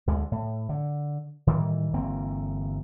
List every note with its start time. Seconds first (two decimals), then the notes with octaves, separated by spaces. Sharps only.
0.07 D2 D3 G#3
0.32 A2
0.69 D3
1.47 A2 D#3 E3 G3
1.93 G1 E3 A#3 C4